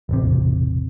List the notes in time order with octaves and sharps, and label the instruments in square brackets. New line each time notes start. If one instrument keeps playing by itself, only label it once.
[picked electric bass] E1 A1 C3